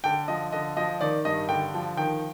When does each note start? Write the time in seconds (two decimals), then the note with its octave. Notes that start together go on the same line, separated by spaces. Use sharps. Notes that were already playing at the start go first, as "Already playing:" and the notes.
0.04 D3 G5
0.28 F3 D#5
0.52 D3 D#5
0.77 F3 D#5
1.01 D#3 D5
1.25 G2 D#5
1.49 D3 G5
1.74 F3
1.97 D#3 G5